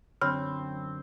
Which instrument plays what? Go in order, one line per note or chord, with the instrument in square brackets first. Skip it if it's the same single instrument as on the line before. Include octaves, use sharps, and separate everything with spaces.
[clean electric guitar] F#2 D3 F#3 [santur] C4 [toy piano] C#5 B5 [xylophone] F6